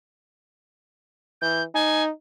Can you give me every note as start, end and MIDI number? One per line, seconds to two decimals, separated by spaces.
1.41 1.64 52
1.41 1.62 91
1.74 2.10 63
1.74 2.03 80